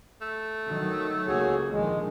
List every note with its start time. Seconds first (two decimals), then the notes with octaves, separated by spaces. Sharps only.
0.22 A3
0.66 D#3 F#3
1.27 C#2 A#3 F#4 G#4 C#5
1.71 A#1 D3 D#3 G#3